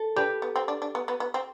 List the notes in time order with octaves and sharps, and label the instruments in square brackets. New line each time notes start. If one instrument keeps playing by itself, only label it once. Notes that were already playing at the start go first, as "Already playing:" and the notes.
Already playing: [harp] A4
[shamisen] D4 [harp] G4 B4
[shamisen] B3
C4
D4
D4
B3
B3
B3
C4